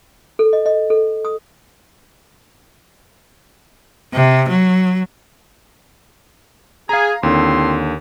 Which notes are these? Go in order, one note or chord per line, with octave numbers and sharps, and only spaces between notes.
A4
D#5
D#5
A4
D#6
C3
F#3
G#4 F5 A#5
D#2 D3 C4 E4 C6